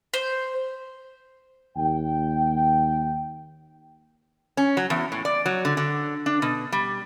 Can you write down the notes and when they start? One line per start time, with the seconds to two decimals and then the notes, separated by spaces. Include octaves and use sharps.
0.14 C5
1.77 D#2 G5
4.57 C#4
4.77 F#3
4.90 E2
5.12 A2
5.25 D5
5.46 F#3
5.65 D3
5.77 D3
6.26 D4
6.42 B2
6.72 G3